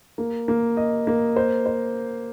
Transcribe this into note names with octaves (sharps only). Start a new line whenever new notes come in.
A#3
A#3
D#5
A#3
C5
C5